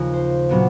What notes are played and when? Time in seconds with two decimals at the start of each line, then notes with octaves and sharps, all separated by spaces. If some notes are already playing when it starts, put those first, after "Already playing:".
Already playing: D#2 C#3 F3
0.14 C5
0.49 A#2 F#3 B3 D4